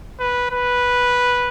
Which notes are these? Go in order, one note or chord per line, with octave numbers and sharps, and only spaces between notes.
B4
B4